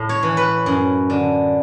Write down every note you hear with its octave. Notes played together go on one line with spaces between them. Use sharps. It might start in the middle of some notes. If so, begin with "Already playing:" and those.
Already playing: A2
C#5
E3
B4
F#2
D3